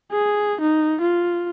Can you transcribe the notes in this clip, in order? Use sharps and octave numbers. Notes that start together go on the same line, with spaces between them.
G#4
D#4
F4